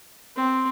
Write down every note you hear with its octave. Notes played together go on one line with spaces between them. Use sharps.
C4